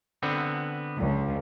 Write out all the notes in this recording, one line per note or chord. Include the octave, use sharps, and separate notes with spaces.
D3 B3 C4
C#2